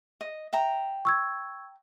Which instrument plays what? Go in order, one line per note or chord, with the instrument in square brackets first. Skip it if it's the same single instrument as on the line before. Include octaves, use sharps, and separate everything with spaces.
[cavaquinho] D#5
E5 G5 A#5
[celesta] C#6 E6 G#6